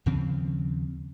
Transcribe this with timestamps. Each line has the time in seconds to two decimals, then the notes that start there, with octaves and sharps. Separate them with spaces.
0.06 D#2 C#3 F3 C4